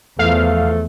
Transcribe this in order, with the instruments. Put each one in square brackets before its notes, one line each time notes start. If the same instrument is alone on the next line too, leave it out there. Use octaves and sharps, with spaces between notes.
[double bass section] E2 F3 [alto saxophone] A3 [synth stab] F5